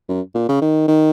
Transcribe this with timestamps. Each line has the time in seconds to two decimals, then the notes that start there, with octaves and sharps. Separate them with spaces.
0.09 F#2
0.34 A#2
0.49 C#3
0.61 D#3
0.88 D#3